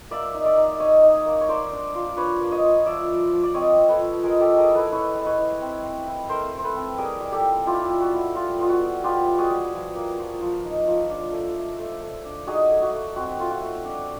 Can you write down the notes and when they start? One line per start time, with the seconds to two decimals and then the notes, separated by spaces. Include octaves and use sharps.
0.11 A#3 D5 E5
0.34 D#4
0.46 D5 E5
0.57 D#4
0.80 D#4 C#5 D#5
1.03 D#4
1.26 A#3
1.41 C#5
1.49 A#3 C5 D5
1.72 D4
1.95 F4
2.17 D4 B4 C#5
2.41 A#3
2.52 C#5 D#5
2.63 F4
2.86 F3 D5 E5
3.09 F3
3.32 F3
3.43 D5
3.54 C4 C#5 D#5
3.78 F3
3.89 A4 B4
4.00 F3
4.23 G#3 G#4 A#4
4.40 G4 A4
4.46 G#3
4.58 G#4 A#4
4.69 E4
4.75 A4 B4
4.92 E4 B4 C#5
5.15 G#3
5.26 B4 C#5
5.38 E4
5.61 C4
5.84 C4
6.07 E4
6.29 A3 A#4 C5
6.52 A3
6.58 C5
6.64 A4 B4
6.75 C4
6.98 G3 G#4 A#4
7.21 G3
7.32 G4 A4
7.44 G3
7.66 E4 F4 G4
7.90 G3
8.01 F#4
8.13 E4
8.35 G3 F4
8.59 B3 F4
8.69 F#4
8.81 B3
9.03 B3 F4 G4
9.27 G3
9.38 F#4 G#4
9.50 G3
9.73 F3
9.96 A#3
10.18 F3
10.41 F3
10.65 D#4
10.88 F3
11.10 D4
11.33 A3
11.56 A3
11.79 A3
12.01 A3
12.25 D4
12.47 D#4 F#4 G#4
12.70 A3
12.82 F#4
12.93 A3
13.16 C4 F#4
13.39 A3 F4
13.51 F#4
13.62 A3
13.85 D4